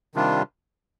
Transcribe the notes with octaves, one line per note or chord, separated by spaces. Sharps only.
C3 D#3 G3 D4 F4